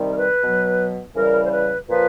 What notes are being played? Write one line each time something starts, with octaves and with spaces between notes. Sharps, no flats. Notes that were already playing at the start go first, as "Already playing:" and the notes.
Already playing: C3 D#3 G3
A#4
B4
B2 F#3
C#3 E3 G3 A#4
C5
B4
A#2 F3 B4